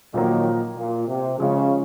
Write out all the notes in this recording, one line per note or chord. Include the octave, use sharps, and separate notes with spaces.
A#2 D#3 F3 F#3 A#3
A#2
C3
C#3 F3 G#3 C#4